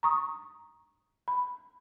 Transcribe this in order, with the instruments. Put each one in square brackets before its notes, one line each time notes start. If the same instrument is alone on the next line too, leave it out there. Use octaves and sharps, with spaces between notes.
[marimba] A#5 C#6 D#6
B5